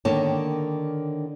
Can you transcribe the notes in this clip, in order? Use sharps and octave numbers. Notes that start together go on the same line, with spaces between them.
D3 D#3 A#3 C#5 G5 A5